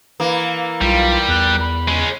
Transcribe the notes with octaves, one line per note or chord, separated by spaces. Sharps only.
E3 A#3
B1 G3 F4
E2 F#6
B5
G#3 C#4